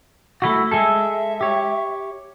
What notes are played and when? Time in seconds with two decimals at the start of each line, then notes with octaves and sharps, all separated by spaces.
0.42 A3 E4 F#4
0.71 G#3 G#4 A4 E5
1.41 G4 C#5